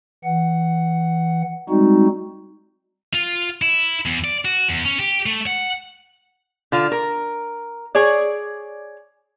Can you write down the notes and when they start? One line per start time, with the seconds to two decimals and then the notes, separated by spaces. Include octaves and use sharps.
0.24 E3 F#5
1.69 G3 G#3 C4 D#4 F#4
3.14 F4
3.62 E4
4.06 E2
4.24 D5
4.45 F#4
4.68 E2
4.85 C#4
4.99 G4
5.26 A3
5.47 F#5
6.72 D3 F4
6.92 A#4
7.95 G#4 C#5 D5